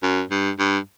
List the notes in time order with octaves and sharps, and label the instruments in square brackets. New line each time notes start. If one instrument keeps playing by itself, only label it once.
[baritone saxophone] F#2
G2
G2